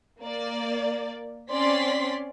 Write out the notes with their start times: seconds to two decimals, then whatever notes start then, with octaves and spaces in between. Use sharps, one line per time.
0.21 A#3 D5
1.51 C4 C#4 D5 C6 B6